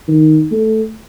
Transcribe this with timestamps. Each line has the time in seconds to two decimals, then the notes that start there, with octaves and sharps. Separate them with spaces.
0.08 D#3
0.52 A3